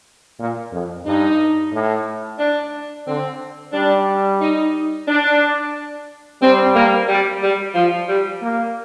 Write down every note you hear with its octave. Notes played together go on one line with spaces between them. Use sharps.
A#2
F2
G2 D#4
A2
D4
D3 C4
G3 D4
D#4
D4
G3 C4
A#3
G3
G3
F3
G3
A#3